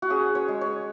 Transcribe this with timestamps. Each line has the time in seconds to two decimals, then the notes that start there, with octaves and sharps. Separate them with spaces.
0.02 F#4
0.10 C#4 G#4
0.35 C#5
0.48 G#3
0.61 C#5